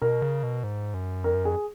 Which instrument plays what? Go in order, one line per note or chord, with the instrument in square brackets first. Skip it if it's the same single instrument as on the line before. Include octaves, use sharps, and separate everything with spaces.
[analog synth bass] B2 [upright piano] A#4
[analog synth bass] C#3
B2
G#2
F#2
[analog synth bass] F2 [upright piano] A#4
[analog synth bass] F#2
[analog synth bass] F2 [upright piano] G#4